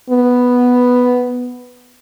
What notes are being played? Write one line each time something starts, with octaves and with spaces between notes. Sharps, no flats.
B3